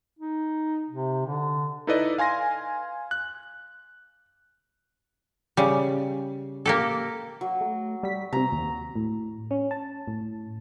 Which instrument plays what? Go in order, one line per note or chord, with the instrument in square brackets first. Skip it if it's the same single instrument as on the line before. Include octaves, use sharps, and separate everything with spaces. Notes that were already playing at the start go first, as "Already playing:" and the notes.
[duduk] D#4
C3
D3
[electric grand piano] D#4 E4 A4 B4 D5 D#5
F5 G#5 C6 A#6
F#6
[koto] C#3 G3
A#3 G4 A4
[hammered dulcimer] F#3
[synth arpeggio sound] A3
G3 B6
[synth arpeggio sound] C3 C4 [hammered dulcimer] A#5
[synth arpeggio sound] D#2
[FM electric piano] A2
C#4
A5
A2